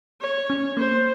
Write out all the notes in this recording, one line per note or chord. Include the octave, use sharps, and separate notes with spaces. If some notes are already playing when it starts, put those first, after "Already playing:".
C#5
C#4
A#3 C5